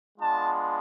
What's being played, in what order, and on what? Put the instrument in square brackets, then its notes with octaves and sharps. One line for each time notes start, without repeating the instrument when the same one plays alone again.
[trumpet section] G#3 B3 D4 F4 A5